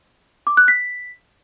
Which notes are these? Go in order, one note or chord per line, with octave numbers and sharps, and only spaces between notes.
D6
F#6
B6